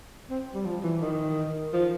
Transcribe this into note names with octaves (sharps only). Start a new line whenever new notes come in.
C4
G3
F3
E3
D#3
F3